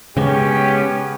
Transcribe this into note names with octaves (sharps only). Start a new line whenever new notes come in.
C#3 G#3 B3 C#4 G4